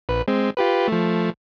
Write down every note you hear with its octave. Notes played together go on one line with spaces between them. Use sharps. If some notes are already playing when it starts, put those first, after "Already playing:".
A#1 B4
G#3 C4
F4 G4 B4
F3 A3